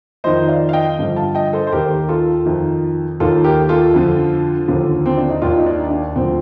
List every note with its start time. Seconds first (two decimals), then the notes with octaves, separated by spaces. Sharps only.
0.24 F2 D#3 C5 D#5
0.49 D5 F5
0.69 F5
0.73 D#5 G5
0.99 G2 D3 F3
1.16 F5 A5
1.35 D#5 G5
1.53 A4 C5
1.67 C5
1.72 D#2 D#3 G4 A#4
2.09 F4 A4
2.46 F2 D#3
3.20 D#2 D#3 F4 A4
3.44 G4 A#4
3.69 F4 A4
3.94 F2 D3 F3
4.68 D#2 D3 F3
5.06 C4
5.18 D4
5.30 D#4
5.42 D#2 D#3 D4 F4
5.58 D#4
5.66 D4
5.91 D4
6.16 D2 D3 F3 C4